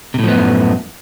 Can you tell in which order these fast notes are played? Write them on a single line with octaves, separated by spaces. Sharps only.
C3 A2 F3 B3 F#2